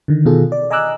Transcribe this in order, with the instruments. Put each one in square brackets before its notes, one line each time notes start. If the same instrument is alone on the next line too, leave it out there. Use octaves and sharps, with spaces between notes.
[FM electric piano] D3 D#3
B2 D#3 F4 G#4 A4
D5
D#5 G#5 A#5 D6 E6 F#6